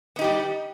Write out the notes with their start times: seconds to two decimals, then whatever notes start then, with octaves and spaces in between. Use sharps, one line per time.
0.16 B3
0.19 D#4
0.21 G4
0.24 G3